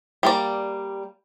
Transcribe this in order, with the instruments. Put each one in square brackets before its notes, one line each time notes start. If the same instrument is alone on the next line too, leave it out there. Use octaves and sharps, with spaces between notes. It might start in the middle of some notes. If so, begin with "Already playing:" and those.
[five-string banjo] G3 A#3 D5